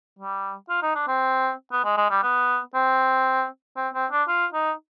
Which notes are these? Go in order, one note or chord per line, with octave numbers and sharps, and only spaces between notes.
G3
F4
D#4
D4
C4
B3
G#3
G#3
G3
B3
C4
C4
C4
D4
F4
D#4